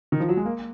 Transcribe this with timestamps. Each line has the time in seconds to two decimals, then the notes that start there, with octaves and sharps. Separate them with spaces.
0.12 D#3
0.20 F3
0.29 F#3
0.37 G#3
0.45 A#3